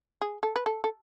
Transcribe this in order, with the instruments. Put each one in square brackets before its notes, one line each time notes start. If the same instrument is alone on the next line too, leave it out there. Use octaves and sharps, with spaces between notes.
[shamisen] G#4
A4
B4
A4
A4